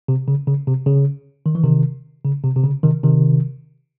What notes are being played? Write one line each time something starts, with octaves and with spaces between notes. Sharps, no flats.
C3
C#3
C#3
C3
C#3
D#3
E3
C3 D#3
C#3
C3
C3
C#3
C3 D#3
C3 D#3